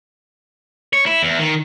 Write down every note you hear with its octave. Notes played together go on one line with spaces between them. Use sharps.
C#5
E4
E2
D#3